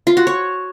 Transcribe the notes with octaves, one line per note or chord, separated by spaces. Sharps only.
F4
F#4
C#5